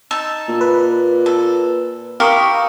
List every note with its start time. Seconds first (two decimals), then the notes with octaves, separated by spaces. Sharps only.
0.11 D#4 A5 E6
0.49 A#2
0.61 B4
1.26 A4
2.20 E4 G4 A#4 F5 C#6 D#6